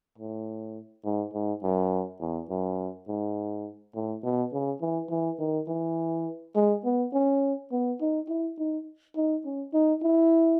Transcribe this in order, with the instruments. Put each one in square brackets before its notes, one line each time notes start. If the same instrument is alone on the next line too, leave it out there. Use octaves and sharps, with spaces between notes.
[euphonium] A2
G#2
G#2
F#2
E2
F#2
G#2
A2
B2
C#3
E3
E3
D#3
E3
G#3
B3
C#4
B3
D#4
E4
D#4
D#4
C#4
D#4
E4